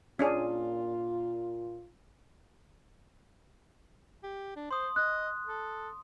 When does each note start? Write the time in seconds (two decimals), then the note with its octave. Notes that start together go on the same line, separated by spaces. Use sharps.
0.19 A#2 C#4 D4 F4 G#4
4.23 G4
4.56 D4
4.71 C5 C6 D#6
4.96 D#5 F#6
5.47 A4